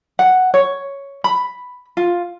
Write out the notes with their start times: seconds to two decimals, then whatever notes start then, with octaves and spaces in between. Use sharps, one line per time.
0.19 F#5
0.54 C#5
1.24 B5
1.97 F4